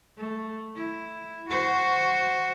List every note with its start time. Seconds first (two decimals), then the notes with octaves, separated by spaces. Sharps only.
0.17 A3
0.76 E4
1.48 F#4 C5